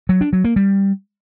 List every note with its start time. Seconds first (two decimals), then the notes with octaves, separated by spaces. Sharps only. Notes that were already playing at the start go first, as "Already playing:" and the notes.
0.09 F#3
0.21 D4
0.33 F#3
0.44 A#3
0.56 G3